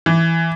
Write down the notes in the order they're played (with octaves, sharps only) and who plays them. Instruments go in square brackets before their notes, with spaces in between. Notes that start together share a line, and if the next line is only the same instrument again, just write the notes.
[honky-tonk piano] E3